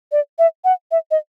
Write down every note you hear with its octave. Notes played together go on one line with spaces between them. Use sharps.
D5
E5
F#5
E5
D#5